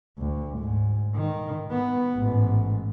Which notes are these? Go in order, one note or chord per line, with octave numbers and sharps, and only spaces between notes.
D2
G#2
D#3
B3
A1 G#2